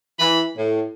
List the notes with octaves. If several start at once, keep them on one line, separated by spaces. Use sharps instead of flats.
E3 B5
A2